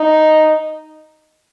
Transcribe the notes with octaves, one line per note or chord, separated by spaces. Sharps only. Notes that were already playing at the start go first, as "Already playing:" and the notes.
Already playing: D#4